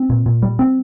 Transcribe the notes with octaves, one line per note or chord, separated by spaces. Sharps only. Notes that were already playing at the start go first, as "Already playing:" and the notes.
Already playing: C4
A#2
A#2
G3
C4